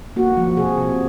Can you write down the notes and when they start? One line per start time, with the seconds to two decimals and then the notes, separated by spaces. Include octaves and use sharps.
0.16 A#3 F#4
0.37 F3
0.57 C3 G#4
0.78 C3